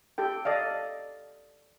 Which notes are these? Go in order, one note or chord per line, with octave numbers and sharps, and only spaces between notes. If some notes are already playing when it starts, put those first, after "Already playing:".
G4 A4 G5
A4 D5 D#5 F5